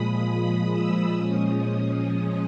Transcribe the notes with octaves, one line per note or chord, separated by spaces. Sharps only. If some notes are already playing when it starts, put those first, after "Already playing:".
Already playing: A#2 F3 G#3 B5 D#6
E6
A#2 F3 G#3 C#4 D#6